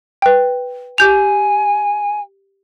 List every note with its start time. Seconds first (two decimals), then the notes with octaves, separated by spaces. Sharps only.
0.22 B4 G5
0.98 G4 G#5 G6 F7